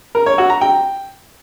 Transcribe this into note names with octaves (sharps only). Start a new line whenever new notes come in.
A#4
C#5
F#4
A#5
G5